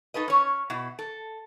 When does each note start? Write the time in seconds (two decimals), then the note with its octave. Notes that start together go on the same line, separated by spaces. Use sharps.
0.14 D#4 A4 B4 D#5
0.28 C#4 C#5
0.70 B2 E4
0.99 A4